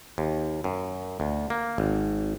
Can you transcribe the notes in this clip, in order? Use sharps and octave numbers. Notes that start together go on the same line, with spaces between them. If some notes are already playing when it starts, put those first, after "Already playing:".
D#2
F#2
D2
A#3
G#1